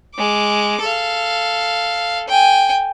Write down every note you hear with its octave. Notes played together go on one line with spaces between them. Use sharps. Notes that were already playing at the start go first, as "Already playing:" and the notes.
G#3 D6
A4 F5
G5 G#5